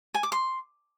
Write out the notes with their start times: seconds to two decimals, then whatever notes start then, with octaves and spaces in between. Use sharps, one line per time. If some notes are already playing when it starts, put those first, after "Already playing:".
0.14 G#5
0.23 D6
0.32 C6